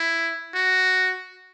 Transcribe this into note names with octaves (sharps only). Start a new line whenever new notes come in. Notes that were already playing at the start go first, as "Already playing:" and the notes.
Already playing: E4
F#4